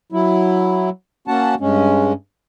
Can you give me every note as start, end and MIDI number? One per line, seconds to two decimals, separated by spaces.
0.12 0.90 54
0.12 0.90 64
1.28 1.55 58
1.28 1.55 61
1.28 1.55 66
1.28 1.55 78
1.28 1.55 81
1.60 2.13 43
1.60 2.13 56
1.60 2.13 61